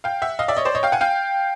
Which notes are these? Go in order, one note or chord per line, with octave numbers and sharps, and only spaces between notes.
F5 G5
E5 F#5
D#5 F5
D5 E5
C#5 D#5
C5 D5
C#5 D#5
F5 G5
F#5 G#5
F5 G5